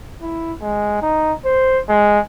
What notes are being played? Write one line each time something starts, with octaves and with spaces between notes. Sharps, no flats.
E4
G#3
D#4
C5
G#3